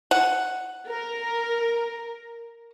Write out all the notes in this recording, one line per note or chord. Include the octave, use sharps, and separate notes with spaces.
F#5
A#4